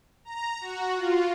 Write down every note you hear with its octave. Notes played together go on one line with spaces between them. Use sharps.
A#5
F#4
F4